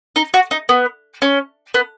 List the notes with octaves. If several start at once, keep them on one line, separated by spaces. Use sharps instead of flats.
D#4
F#4
D#4
B3
C#4
B3